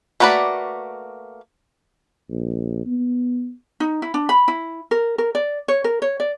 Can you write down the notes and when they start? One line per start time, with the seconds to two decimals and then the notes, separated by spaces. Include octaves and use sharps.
0.20 A3 A#3 F#4 B4 D5
2.29 A#1
2.86 B3
3.80 D#4
4.02 E4
4.14 D4
4.29 B5
4.48 E4
4.91 A#4
5.18 A#4
5.35 D5
5.68 C#5
5.84 A#4
6.02 C#5
6.20 D5